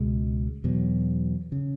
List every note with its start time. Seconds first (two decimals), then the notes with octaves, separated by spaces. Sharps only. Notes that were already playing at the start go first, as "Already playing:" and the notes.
Already playing: C#2 B2 G#3
0.64 E2 B2 F#3
1.52 C#3